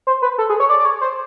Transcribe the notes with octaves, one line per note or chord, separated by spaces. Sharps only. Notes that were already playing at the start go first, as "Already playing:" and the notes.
C5
B4
A4
G#4
C#5
D5
D5
C#5
C5